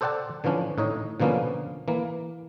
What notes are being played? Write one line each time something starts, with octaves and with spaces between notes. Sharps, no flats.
A4 C5 D5 F#5 G5 A5
D3 E3 F3 C#4 D4
A2 D#4 C#5 D#5
B2 D3 F3 A#3 B3 C#4
E3 A#3